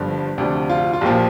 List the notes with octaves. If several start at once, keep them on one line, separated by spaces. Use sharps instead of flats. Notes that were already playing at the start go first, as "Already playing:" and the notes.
Already playing: G1 G2 D3 F3
D2 C3 F3 D4
F4
F4
A#1 A#2 F3 G4